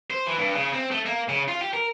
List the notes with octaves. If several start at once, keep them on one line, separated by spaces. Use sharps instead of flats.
C5
E3
G2
C#3
C4
A3
A#3
C#3
F4
G4
A#4